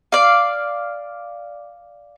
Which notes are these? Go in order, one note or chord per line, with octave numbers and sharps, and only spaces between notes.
D5 F5